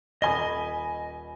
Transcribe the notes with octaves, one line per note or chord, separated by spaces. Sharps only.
D#1 D#5 G#5 B5 D#6 G7